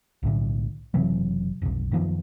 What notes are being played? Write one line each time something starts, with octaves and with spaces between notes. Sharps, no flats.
B1 A2 D3
F#1 C3 E3 F#3
F1 B1
F#2 D#3 F3 B3